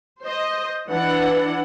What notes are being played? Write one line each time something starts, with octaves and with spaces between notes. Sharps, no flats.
C5 D#5
E3 D4 F#5